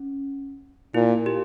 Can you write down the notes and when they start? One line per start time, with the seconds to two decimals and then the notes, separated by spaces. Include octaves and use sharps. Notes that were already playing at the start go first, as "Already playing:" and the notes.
Already playing: C#4
0.94 A#2 E4
1.26 G4